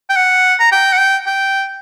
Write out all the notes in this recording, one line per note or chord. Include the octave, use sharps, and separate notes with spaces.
G5
F#5
A#5
G5
F#5
G5
G5